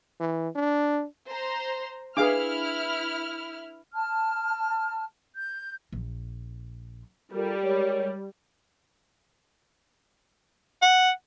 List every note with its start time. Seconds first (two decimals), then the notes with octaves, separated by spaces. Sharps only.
0.20 E3
0.56 D4
1.28 C5 A#5 C6
2.17 D4 E4 G#4 B4 F5 D6 F6
3.93 A5 F6
5.35 G6
5.92 A#1
7.33 G3 F4 A4 A#4
7.63 G#3 A#4 C#5
10.82 F#5